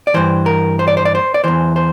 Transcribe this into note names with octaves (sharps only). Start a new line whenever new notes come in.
D5
G2 E3 C5
A#4
C5
D5
C5
D5
C5
D5
E2 E3 C5
C5